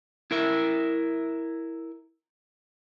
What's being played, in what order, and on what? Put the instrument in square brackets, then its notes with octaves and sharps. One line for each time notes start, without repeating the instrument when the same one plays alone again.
[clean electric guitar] E4 A#4 E5